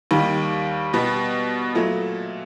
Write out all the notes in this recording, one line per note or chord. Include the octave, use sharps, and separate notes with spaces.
D#2 D#3 G3
B2 G3 B3
A#2 F#3 A3